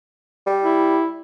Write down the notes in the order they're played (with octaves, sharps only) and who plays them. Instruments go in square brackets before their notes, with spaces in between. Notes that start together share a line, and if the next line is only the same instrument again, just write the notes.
[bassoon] G3
[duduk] E4